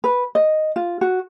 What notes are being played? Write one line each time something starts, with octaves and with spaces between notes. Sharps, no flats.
B4
D#5
F4
F#4